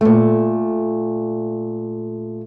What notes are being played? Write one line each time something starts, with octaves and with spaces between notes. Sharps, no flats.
A#2 A3